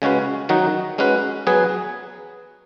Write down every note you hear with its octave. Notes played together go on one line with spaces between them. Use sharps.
C#3 G#3 C#4 F#4 B4
D#3 F#3 D#4 F#4
G#3 C#4 F#4 B4
F#3 B3 G#4 B4